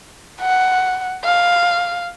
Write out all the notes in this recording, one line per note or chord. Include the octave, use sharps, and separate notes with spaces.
F#5
F5